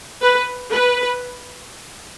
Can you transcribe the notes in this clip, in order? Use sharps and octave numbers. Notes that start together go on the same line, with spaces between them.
B4
B4